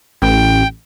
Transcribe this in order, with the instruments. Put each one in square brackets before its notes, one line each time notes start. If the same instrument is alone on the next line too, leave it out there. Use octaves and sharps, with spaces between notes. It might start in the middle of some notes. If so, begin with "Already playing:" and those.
[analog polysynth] A1 [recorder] G5